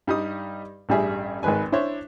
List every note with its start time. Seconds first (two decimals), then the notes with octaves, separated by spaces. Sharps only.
0.07 G2 G3 D#4 D#6
0.89 A1 G2 G3 G#4 E5
1.43 G#1 D#3 G#3 B4 G#5
1.72 D4 E4 C5 C#5